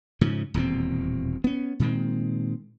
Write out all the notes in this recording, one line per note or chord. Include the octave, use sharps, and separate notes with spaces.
G#2 C#3 F3
D#1 E2 B2 C4
B3 C#4
A#2 D#3 G#3 C4